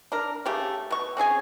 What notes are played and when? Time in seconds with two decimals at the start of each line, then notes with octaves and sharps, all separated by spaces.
0.12 D4 A#4
0.46 C#3 A3 G4
0.90 B2 C#6
1.17 C4 C#4 G#4 G#5